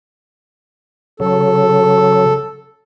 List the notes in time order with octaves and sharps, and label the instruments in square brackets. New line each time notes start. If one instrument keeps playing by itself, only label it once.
[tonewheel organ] C#3 F#3 [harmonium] A4